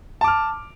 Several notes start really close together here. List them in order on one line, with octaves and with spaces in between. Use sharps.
A5 D6 F6